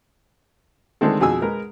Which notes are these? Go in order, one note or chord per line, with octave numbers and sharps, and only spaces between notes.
D3 D#3 G#3 A3 C4 A4
F2 B2 G#4 G#5 E6
G#3 A#4 B4